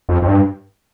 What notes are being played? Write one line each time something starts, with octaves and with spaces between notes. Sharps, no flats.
F2
F2
G2